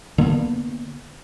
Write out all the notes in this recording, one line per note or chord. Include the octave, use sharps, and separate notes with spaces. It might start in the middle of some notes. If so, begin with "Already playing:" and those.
D3 A#3 B3